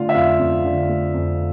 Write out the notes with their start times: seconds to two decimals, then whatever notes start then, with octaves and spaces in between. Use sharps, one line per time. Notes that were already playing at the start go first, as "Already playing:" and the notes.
Already playing: D3 A3 F4 F5
0.09 E5
0.15 F2 F4 F5
0.39 F2
0.64 D3
0.89 A3
1.14 F2